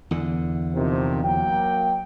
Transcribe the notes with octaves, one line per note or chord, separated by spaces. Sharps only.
E2 D3
C3 D#3 F3
F#3 A#3 G5